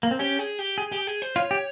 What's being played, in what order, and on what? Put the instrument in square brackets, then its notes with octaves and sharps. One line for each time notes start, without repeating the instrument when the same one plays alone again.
[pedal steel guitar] A#3
C4
[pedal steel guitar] C#4 [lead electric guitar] G4
[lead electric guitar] G#4
G4
[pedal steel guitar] G#4
[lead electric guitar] G4
G#4
C5
[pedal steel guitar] F4 [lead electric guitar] C#5
[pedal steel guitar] G4